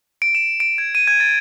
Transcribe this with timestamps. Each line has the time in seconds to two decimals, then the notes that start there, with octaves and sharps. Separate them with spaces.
0.22 D7
0.35 E7
0.60 D7
0.78 G#6
0.95 D#7
1.07 G#6
1.20 A6